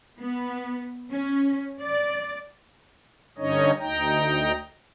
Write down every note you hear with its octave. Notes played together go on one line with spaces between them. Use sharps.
B3
C#4
D5
G2 D3 C#4 D#4 C#5 D#5
D2 D#4 G5 A#5